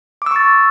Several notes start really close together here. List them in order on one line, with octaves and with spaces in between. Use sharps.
D6 E6 C#6 A6